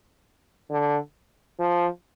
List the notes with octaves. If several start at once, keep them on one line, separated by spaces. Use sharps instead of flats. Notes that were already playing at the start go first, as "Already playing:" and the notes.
D3
F3